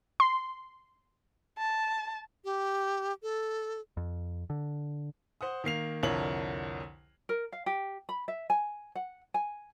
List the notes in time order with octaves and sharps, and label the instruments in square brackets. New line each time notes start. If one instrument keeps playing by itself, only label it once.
[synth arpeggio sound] C6
[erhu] A5
[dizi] G4
A4
[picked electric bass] F2
D3
[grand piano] C5 F#5 D#6
D#3 A#3 C7 F7
C2 F2 D3 A#4 C#5 F#7
[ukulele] A#4
F5
G4
B5
E5
G#5
F#5
G#5